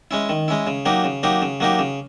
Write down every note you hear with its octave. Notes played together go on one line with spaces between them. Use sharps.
G#3 C#4 E4
D#3
G#3 C#4 E4
C#3
F#3 A#3 D#4 G4
C#3
F#3 A#3 D#4 G4
C#3
F#3 A#3 D#4 G4
C#3